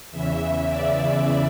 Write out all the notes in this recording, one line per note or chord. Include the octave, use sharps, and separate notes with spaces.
E2 C#3 E3 E5
D5